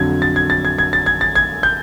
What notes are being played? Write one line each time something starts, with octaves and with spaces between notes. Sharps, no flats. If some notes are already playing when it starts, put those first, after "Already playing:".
Already playing: F2 D3 F#3 G#6
A6
G#6
A6
G#6
G#6
A6
G#6
A6
G#6
G6